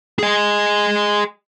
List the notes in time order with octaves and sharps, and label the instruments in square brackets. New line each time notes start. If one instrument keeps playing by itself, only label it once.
[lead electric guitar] G#4 D#5